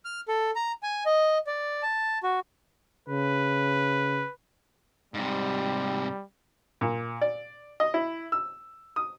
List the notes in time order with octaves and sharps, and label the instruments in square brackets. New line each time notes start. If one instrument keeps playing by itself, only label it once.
[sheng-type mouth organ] F6
A4
A#5
G#5
D#5
D5
A5
F#4
[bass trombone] C#3 [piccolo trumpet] B4
[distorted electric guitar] G#2 C3 [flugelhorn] G3
[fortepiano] A#2
D5
D#5
E4
E6
D#6